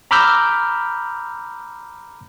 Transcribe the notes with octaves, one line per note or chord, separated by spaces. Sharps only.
A#5 B5 D6 E6 F6 G6